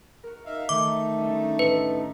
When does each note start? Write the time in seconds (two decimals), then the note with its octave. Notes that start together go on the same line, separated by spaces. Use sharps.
0.24 F#4 A#4
0.45 D#4 E5 F5
0.69 D#3 A3 D#4 D6
1.17 G3 C#4 D4
1.59 A1 B4